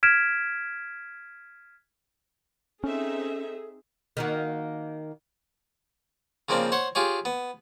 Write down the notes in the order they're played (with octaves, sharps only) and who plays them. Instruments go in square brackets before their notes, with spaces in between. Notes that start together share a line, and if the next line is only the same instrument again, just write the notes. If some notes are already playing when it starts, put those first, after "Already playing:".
[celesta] F6 G#6 B6 D7 E7
[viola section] C4 D#4 E5 [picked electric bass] C#4 [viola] G#4 [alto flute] A4
[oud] D#3 A#3 F#4
[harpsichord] C#3 F3 A#3 C4 D4
C5 C#5 F#5
F4 G4 G#4 C#5
B3